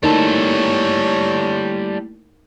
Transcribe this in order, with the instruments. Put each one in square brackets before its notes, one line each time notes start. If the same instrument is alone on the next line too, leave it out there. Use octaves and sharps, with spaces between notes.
[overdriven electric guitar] G3 A4 [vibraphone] A3 A#3 E4 [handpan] D#4 A#4 [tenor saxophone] C#5